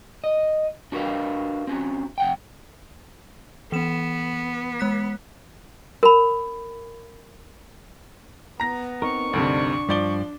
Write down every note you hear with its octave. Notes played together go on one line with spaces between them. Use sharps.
D#5
D4 F#4 A#4 B4 F5
C4 C#4 F#4
F2 F#5 G5
E3 B3 E7
G#3 F#6 B6
A#4 B5
B3 A#5 A#6
C4 D#4 A#4 C#6
D2 G2 C3 D4
G2 F3 D5 G7